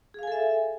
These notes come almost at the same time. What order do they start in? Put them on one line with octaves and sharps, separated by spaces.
G#4 F5 G#5 A4 E5